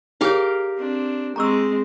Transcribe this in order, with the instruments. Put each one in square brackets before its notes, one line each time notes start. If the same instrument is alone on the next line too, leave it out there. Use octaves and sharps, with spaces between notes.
[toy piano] F4 G#4 C#5 [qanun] G4 A#4 F5
[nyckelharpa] C4 D4
[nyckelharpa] G#3 C4 [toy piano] A#5 C#6 E6